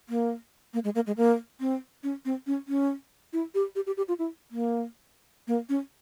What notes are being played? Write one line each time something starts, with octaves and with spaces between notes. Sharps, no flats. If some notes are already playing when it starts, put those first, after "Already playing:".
A#3
A#3
G#3
A#3
G#3
A#3
C4
C#4
C4
C#4
C#4
E4
G4
G4
G4
G4
F4
E4
A#3
A#3
C#4